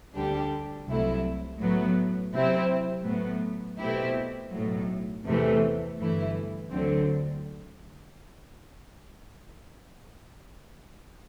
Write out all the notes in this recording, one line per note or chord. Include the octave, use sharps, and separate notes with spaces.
D2 D3 G3 D4 G4
C2 C3 F#3 A3 E4
A2 F#3 B3
C3 F#3 C4 E4
A2 F#3 B3
B2 A3 C4 E4 G4
B1 A2 F#3
E2 C3 E3 A3
G1 G2 E3 A3 E4
D2 D3 F#3 C4